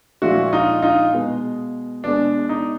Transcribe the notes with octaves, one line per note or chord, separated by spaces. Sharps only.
A#2 F3 G#3 E4 F#4
D#4 F4
D#4 F4
B2 G#3
B2 G#3 D4
D#4